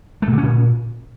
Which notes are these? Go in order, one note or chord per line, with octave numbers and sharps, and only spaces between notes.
A3
A#2
D3
C#4
A#2